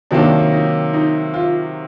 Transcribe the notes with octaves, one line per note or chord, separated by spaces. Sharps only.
C3 D#3 F#3 A#3 D4
D#4
D#4
F4